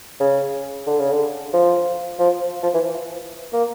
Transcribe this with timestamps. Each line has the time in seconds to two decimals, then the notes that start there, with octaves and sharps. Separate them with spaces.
0.20 C#3
0.87 D3
1.00 C#3
1.12 D3
1.53 F3
2.19 F3
2.63 F3
2.74 E3
3.52 A#3